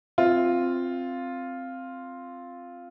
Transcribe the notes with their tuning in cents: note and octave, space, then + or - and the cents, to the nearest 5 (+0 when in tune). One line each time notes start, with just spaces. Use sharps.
C4 +0 F4 +0